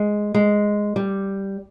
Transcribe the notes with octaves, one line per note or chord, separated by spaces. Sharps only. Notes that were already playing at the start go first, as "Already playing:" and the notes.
Already playing: G#3
G#3
G3